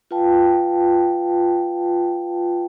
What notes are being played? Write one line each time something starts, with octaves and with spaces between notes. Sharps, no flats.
F4 B4 F5 G5 A5